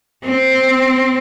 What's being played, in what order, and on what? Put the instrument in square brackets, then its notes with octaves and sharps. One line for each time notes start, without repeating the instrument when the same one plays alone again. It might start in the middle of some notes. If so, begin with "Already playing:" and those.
[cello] C4